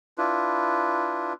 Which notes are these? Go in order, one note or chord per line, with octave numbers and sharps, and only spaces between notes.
D4 E4 F4 B4